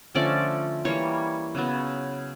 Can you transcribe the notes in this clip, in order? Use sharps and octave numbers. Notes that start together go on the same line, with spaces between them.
D3 F3 A3 C#4 D5
E3 G3 A#3 C#5
C#3 F#3 B3